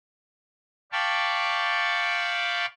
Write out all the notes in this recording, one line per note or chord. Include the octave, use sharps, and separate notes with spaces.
D5 F5 G5 A5 B5 C#6